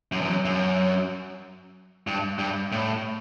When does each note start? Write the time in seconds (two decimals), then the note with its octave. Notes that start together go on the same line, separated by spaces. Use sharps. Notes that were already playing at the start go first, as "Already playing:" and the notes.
0.12 F#2
0.21 E2
0.30 F#2
0.45 F#2
2.07 G2
2.39 G2
2.72 A2